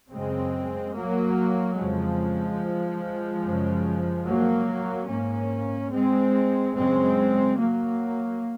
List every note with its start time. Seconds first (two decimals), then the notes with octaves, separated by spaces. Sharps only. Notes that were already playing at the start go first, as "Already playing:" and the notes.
0.12 F#2 C#3 G#3 C4
0.94 F#3 A#3
1.77 F2 C#3 F3 G#3
3.44 F#2 C#3
4.26 F#3 A#3
5.09 G#2 A#3 C#4
5.91 G#3 C4
6.74 F#2 C#3 G#3 C4
7.58 F#3 A#3